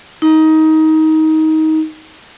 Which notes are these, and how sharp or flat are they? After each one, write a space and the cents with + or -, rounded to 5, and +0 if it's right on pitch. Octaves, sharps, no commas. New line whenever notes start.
D#4 +20